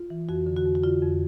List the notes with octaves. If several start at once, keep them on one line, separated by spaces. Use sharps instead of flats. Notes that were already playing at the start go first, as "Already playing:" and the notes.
Already playing: F4
E3
F2 F#4
D3
F#4
F2
F#4
D3 F4
F2